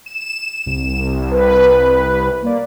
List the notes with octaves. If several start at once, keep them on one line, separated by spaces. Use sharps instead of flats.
E7
C2
B4
A#3 D5